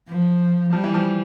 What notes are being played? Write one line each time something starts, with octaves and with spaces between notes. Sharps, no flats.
F3
F3 G3
E3
F3